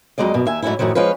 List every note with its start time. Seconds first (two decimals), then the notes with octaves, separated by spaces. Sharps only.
0.18 F2 F#3 G#3 D5 D#5
0.34 F#2 B2
0.46 D#2 E5 G#5
0.62 G#2 F#3 A3 C#4 E4
0.79 F#2 A2 D#3 F3 F#3
0.95 F3 G#3 C#4 F4 B4